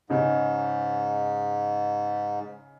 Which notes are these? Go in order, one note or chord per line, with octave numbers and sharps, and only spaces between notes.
G#2 C#3 D#4